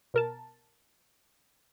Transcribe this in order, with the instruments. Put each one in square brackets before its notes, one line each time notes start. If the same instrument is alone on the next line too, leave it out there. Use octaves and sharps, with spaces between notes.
[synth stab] B2 A#4 A5